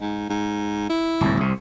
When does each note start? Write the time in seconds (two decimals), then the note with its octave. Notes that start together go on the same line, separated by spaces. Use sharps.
0.01 G#2
0.30 G#2
0.90 E4
1.21 D1 C2 G#2
1.37 C2 C3